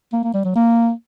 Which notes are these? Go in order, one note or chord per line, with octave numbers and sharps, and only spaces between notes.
A#3
A#3
G3
F#3
A#3